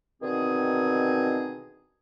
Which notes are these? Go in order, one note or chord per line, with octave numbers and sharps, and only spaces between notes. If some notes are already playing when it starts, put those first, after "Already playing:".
B2 D3 D#3 C4 D#4 G#4